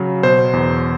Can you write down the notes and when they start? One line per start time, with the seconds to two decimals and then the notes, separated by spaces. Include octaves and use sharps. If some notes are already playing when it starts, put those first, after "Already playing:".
Already playing: C#3 F#3
0.23 B2 C5
0.53 E2